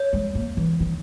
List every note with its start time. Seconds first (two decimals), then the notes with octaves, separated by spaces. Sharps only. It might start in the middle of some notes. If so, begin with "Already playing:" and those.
Already playing: C#5
0.13 G#3
0.35 A#3
0.57 E3
0.80 D#3